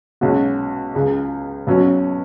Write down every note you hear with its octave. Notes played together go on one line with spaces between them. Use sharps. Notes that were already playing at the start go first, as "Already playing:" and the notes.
B1 B2 G#3 C#4 F#4
C#2 C#3 G#3
B1 B2 F#3 C#4